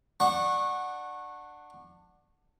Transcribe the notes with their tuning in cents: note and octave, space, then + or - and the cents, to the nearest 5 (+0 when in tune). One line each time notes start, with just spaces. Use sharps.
D4 +15 F#5 -5 C#6 -20